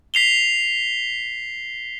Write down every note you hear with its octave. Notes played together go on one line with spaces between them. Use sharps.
B6 C7 F7 G7